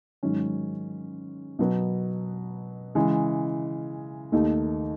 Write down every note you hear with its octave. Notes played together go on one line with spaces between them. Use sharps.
G#2 D#3 F#3 C#4
B2 F#3 B3
C#3 E3 G#3
D#2 D#3 A3 D#4